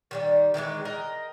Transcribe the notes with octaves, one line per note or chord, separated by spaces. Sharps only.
D#3 F#3 G3
D#3 E3 G3 G#3
A#4 D#5 G5